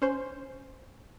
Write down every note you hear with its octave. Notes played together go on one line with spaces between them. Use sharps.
C#4 C5